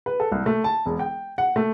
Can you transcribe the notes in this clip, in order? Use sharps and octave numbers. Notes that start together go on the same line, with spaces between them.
B4
A4
C2
A3
A5
E1
G5
F#5
A3